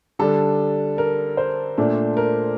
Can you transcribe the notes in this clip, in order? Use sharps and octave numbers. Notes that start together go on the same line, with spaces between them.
D3 G3 D4 A4
A#4
C5
A#2 A3 D4
A#4